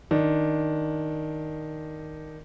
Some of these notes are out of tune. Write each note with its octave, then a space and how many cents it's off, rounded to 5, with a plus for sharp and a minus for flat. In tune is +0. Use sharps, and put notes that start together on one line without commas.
D#3 +0 D4 +0